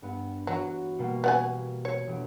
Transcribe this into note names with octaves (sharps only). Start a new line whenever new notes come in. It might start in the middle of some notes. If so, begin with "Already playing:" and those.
G2 B3
E3 F#3 F#4
B2 G3 A#3
B3 F#5 G#5
C#5
E1 D7